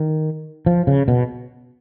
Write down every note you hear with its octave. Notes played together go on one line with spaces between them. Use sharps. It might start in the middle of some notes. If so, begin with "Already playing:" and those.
Already playing: D#3
F3
C#3
B2